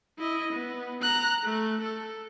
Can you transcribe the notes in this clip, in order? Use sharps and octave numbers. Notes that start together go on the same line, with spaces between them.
E4 D#5
B3
A#5 F#6
A3
A4